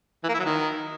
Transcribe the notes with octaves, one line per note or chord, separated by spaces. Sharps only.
E3
A#3
E4
F#3
D#3